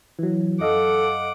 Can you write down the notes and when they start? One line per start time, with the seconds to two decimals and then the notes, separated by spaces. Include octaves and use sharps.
0.19 E3 F#3
0.60 F#2 A4 D#5 F5 F#5 D6